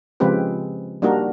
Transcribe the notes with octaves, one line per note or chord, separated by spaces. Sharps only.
C#3 F3 G#3 C4 G4 B4
G3 A#3 D4 D#4 F#4 A#4